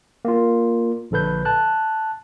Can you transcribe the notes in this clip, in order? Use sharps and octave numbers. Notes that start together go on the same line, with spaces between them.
A#3 F4
A#1 D3 A4 B4 G6
A5 F#6